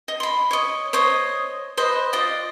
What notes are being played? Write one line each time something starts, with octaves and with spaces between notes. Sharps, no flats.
D#5
B5 C6
C#5 D#5
C5 C#5 D#5 D#6
B4 C5 D#5
F4 D5 D#5